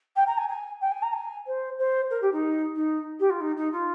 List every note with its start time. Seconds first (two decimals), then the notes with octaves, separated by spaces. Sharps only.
0.16 G5
0.27 A#5
0.37 G#5
0.48 G#5
0.81 G5
0.91 G#5
1.02 A#5
1.13 G#5
1.46 C5
1.78 C5
2.10 A#4
2.21 G4
2.32 D#4
2.75 D#4
3.19 G4
3.30 F4
3.40 D#4
3.56 D#4
3.72 F4